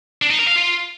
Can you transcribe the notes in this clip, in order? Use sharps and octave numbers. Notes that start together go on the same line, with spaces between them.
D4
D#4
A#4
F5
F4